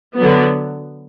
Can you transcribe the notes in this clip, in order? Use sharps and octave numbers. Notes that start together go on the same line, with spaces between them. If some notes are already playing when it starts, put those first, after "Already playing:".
D3 F#3 B3